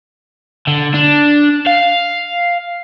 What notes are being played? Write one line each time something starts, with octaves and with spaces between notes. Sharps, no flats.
D3
D4
F5